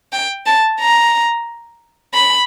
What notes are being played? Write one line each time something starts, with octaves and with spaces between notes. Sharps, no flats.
G5
A5
A#5
B5